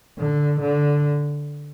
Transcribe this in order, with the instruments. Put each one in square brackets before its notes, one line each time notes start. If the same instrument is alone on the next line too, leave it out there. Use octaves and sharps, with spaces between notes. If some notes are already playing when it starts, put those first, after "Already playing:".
[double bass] D3
D3